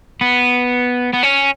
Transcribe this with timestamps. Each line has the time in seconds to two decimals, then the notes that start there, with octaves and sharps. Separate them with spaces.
0.21 B3
1.14 B3
1.23 C#4